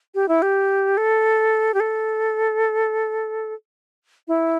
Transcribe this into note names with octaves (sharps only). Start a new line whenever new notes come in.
G4
E4
G4
A4
G4
A4
E4